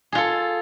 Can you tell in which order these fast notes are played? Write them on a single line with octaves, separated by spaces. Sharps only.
G#4 F4 A4